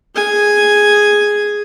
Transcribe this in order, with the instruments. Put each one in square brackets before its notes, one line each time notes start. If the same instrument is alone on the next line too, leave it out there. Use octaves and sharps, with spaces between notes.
[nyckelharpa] G#4 G#5